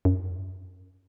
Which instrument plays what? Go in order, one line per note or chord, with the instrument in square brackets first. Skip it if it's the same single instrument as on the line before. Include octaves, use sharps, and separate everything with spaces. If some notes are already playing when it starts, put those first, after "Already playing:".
[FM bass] F#2